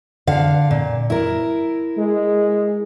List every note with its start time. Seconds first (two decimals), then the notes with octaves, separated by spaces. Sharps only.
0.27 D3 F5
0.71 A#2
1.10 E4 A#4
1.97 G#3